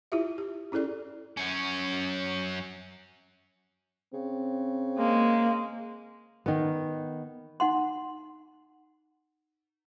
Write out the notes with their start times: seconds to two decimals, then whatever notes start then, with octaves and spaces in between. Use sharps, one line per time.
0.12 E4 F4 G4 E5
0.38 G4
0.72 C#4 E4 G#4 A4 D5
1.37 F#2 C#4
4.14 C#3 C4
4.98 G#3 A#3
6.46 D#3 B3
7.60 D#4 F#5 C6